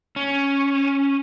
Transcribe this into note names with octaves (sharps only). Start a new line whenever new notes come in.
C#4